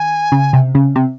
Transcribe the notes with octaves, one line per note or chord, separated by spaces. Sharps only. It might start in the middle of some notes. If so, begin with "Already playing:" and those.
Already playing: D#3 G#5
C#3
C3
C#3
C3